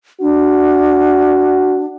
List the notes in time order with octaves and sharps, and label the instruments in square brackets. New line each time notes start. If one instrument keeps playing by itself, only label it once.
[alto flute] D4 [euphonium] F#4